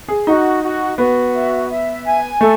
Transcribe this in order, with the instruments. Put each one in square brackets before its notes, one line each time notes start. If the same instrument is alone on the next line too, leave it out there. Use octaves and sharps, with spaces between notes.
[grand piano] G#4
[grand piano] D#4 [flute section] F#4
[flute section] F#4
[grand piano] B3 [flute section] F#4
[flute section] E5
E5
G#5
[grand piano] A3 [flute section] A4